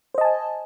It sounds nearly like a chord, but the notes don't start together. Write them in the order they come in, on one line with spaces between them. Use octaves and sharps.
C5 D#5 A5 G#5